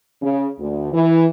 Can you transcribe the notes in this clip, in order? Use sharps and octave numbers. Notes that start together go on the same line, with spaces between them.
C#3
D2
E3